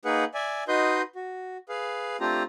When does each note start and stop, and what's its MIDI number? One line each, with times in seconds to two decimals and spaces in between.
0.05 0.24 58
0.05 0.24 63
0.05 0.24 68
0.05 0.24 71
0.05 0.24 78
0.34 0.64 74
0.34 0.64 76
0.34 0.64 80
0.68 1.02 63
0.68 1.02 66
0.68 1.02 71
0.68 1.02 75
0.68 1.02 84
0.68 1.02 91
1.16 1.57 66
1.69 2.17 68
1.69 2.17 71
1.69 2.17 77
2.20 2.43 57
2.20 2.43 60
2.20 2.43 62
2.20 2.43 65
2.20 2.43 67
2.20 2.43 82